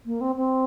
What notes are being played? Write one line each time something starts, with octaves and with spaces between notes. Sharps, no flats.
A#3
C4
C4